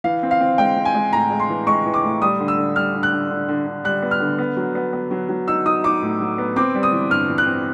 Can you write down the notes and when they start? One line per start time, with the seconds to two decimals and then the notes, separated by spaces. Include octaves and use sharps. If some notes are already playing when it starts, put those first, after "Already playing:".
0.04 E3 F5
0.23 C4
0.31 F5
0.40 C4
0.58 G#3 G5
0.76 C4
0.85 G#5
0.95 G#3
1.13 A2 A#5
1.30 G#3
1.40 C6
1.49 E3
1.67 G#3 C#6
1.85 E3
1.94 D6
2.03 A2
2.22 G3 D#6
2.40 D3
2.48 E6
2.57 D3
2.76 G3 F6
2.94 D3
3.03 F#6
3.12 D3
3.30 D3
3.48 D3
3.67 D3
3.84 G3 F#6
4.02 B3
4.11 F6
4.20 D3
4.38 B3
4.57 F#3
4.75 B3
4.93 B3
5.11 F#3
5.29 F#3
5.48 D#4 E6
5.66 D#4 D#6
5.84 D#4 D6
6.02 A2
6.20 F#3
6.38 B3
6.56 C4 D6
6.75 G3
6.83 D#6
6.92 E3
7.10 G2 F6
7.29 E3
7.38 F#6
7.46 C4